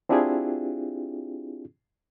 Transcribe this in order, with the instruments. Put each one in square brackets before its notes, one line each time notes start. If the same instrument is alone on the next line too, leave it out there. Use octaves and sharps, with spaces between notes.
[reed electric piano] C4 D4 E4 F4 G4 G#4